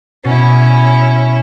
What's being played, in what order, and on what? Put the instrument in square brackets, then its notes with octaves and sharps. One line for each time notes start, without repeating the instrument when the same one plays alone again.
[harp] B2 A6 [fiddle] C#4 E4